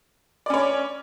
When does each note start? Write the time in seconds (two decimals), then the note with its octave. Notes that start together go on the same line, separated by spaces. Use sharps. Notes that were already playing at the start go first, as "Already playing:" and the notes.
0.46 D5
0.50 C#4
0.54 C#5